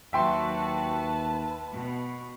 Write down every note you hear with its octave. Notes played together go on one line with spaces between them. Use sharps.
D#2 F#3 F#4 B4 E5 G5 A5 C6
B2